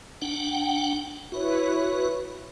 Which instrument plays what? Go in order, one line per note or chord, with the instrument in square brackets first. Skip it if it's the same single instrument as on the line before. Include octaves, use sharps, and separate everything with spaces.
[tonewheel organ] D4 F#5 G5
[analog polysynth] E4 B4 C#5 [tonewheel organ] F#4